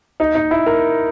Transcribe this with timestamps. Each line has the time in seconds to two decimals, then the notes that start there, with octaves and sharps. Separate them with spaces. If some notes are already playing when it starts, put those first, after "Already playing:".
0.20 D#4
0.35 D#4
0.51 E4
0.66 A#4